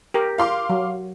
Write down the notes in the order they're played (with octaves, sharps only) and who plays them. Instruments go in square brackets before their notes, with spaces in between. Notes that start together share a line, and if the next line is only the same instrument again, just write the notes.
[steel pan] G4 A#4
[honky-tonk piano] F5 C6 D6
[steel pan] F#3